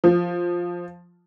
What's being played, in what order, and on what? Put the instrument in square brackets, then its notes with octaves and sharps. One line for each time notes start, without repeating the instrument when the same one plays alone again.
[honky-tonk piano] F3